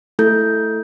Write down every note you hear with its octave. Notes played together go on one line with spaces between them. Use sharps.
A3 E4 A4 G6